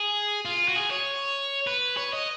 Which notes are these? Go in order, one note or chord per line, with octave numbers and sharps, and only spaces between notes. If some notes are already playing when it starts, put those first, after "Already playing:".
Already playing: G#4
F4
F#4
G#4
C#5
B4
C#5
D#5